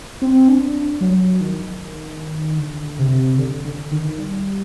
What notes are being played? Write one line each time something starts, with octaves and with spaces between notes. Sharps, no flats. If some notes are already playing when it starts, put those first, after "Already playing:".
C4
D4
F#3
D#3
D3
C3
D3
D3
D#3
G3